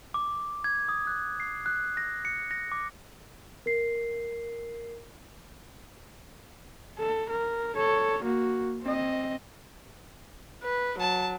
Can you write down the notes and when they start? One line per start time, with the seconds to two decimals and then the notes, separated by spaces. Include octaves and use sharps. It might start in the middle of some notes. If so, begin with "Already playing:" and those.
0.14 D6
0.64 G#6
0.89 D#6
1.07 F#6
1.40 C7
1.66 F#6
1.97 A#6
2.25 C#7
2.51 A#6
2.72 D6
3.66 A#4 C7
6.98 A4
7.29 A#4
7.76 A4 C#5
8.23 A#3 F#4
8.82 C4 D#5
10.63 B4
11.00 F#3 A5